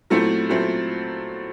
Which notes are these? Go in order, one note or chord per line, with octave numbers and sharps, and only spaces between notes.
A#2 F#3 A3 C4 E4
A#2 F#3 A3 C4 E4